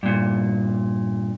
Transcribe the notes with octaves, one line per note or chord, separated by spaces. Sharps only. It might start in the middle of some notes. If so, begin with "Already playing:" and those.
G2 A#2